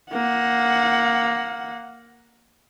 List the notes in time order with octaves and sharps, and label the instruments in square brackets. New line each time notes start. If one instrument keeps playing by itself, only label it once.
[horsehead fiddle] A#3 F#5